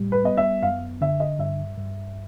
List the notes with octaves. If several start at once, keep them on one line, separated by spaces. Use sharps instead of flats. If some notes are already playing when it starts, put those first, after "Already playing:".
Already playing: A2 G3
B4
B3 D#5
E5
F#2 F5
D3 E5
D#5
G2 E5
G2